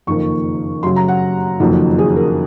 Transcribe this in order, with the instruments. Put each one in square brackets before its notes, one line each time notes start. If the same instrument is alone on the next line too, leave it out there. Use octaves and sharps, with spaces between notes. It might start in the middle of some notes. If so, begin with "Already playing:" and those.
[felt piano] F#1 F2 D#3 A#3 C#6
F#2 C#3 F#3 C6
A#5
F#5
F#1 F2 D#3 F#3
G#4
A#4